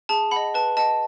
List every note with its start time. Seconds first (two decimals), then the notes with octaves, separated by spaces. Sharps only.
0.09 G#4 A5
0.31 D#5 F#5 B5
0.54 B4 A5
0.77 D#5 F#5 A5